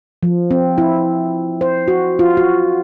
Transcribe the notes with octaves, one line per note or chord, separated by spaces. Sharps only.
F3
C4
E4
C5
F#4
F4
F#4